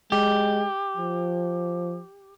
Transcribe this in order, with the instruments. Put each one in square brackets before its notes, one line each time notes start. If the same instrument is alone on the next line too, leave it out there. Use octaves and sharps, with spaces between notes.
[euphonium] G#3 [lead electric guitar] G4
[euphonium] F3